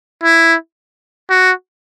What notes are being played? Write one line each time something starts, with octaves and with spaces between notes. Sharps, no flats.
E4
F#4